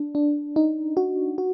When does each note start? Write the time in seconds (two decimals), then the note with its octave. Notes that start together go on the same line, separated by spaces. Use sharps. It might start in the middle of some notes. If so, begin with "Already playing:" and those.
Already playing: D4
0.15 D4
0.56 D#4
0.97 F#4
1.38 F#4